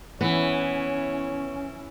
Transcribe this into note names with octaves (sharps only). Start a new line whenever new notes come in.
E3 B3 C#4 E4 C#5